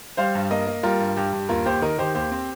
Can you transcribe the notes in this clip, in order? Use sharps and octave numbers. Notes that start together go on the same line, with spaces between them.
G3 C5 F5
G2
A#3 A#4 D#5
A#3
G3 F4 A#4
G2
G2 G4
G2
D#2 F4 A#4
D#2 G4 C5
D#3 A#4 D#5
D#3 G4 C5
D#2 G4 C5
C4